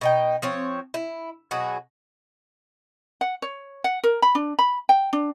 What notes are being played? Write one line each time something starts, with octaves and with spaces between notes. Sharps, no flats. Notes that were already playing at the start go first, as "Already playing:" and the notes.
B2 D#4 G5
F3 C4 C#5
E4
B2 F#3 F#4 G#4
F#5
C#5
F#5
A#4
B5
D4
B5
G5
D4